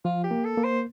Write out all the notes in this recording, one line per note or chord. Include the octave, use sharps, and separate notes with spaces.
F3 F4
G4
A#3
A4
A#3
C5